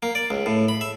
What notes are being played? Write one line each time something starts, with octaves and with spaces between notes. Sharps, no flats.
A#3
D5
C#2
A2
B5
E5